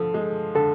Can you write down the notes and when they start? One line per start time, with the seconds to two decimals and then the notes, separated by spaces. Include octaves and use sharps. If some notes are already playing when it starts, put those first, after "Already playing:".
Already playing: D3 F3 A4
0.14 G#3
0.55 D3 A4